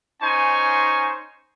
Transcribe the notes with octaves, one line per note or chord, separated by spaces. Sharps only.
C#4 D#4 C5 G#5 C#6